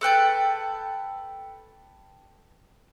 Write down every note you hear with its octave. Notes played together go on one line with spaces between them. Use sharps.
A4 B4 G5 A5